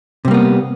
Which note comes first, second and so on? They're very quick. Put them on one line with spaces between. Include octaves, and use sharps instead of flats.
C3 G3 A#3 B3